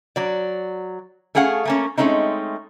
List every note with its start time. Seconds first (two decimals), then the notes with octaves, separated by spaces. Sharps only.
0.16 F#3 D5
1.35 A3 C#4 G#4 F5 F#5
1.65 A3 A#3 C#4
1.98 G#3 A3 C4 C#4 D#4